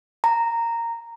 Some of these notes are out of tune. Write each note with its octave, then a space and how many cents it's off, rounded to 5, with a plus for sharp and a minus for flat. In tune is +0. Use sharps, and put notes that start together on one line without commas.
A#5 -10